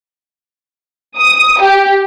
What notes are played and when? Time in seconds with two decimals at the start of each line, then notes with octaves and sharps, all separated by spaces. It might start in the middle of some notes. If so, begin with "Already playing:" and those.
1.18 D#6
1.61 G4